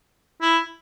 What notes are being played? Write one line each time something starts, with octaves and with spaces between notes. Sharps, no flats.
E4